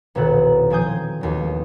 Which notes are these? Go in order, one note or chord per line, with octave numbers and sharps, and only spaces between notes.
E1 B1 A#2 D#3 A4 F#5
F3 C4 G#5 D#6 G6
A1 D#2 F#3